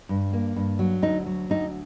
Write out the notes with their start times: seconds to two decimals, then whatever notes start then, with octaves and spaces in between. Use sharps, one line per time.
0.09 G2
0.33 A#3
0.56 G2
0.79 F#3
1.02 D2 D#4
1.26 F#3
1.50 D2 D#4